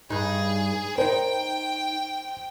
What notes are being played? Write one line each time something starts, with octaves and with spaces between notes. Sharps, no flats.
G2 D#4 G#4
D#4 A#4 C5 G5